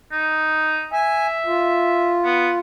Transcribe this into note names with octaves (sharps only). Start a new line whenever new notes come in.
D#4
E5 G#5
F4
B3